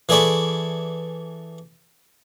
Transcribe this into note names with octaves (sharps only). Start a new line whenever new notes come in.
E3 G#4 A4 D5 B5 C#6